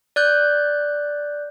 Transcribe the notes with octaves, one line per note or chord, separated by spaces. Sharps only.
D5 F#6 G6